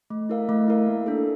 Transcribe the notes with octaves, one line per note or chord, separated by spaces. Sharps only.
A3
E4 A#4 F5
A3
E4 A#4 F5
A#3
D4 A4